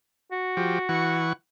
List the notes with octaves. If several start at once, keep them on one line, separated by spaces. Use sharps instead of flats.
F#4
F3 G4
E3 F#5 C#6